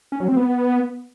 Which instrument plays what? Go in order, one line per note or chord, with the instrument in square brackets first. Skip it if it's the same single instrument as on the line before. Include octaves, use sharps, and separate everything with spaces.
[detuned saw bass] C#4
F#3
C4
B3